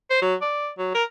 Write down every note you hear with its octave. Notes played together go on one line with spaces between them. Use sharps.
C5
F#3
D5
F#3
A#4